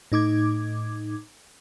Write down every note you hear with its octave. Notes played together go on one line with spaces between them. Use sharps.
A2 D#4 D6 G#6